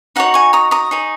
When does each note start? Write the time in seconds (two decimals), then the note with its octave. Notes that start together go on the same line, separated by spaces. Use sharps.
0.16 D#4 F#4 C#5 F#5 A#5
0.34 G#5 C#6
0.53 A#5 D#6
0.71 A#5 D#6
0.91 D#4 G#4 C#5